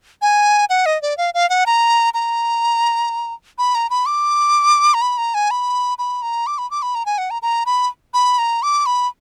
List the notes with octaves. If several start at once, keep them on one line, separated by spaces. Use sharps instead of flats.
G#5
F#5
D#5
D5
F5
F5
F#5
A#5
A#5
B5
A#5
B5
D6
A#5
B5
A#5
G#5
B5
B5
A#5
D6
B5
D6
B5
A#5
G#5
F#5
A#5
A#5
B5
B5
A#5
D6
B5